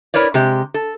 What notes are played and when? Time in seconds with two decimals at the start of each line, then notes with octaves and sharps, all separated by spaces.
0.14 E4 A#4 B4 C#5 D5
0.34 C3 G#3 G4
0.74 A4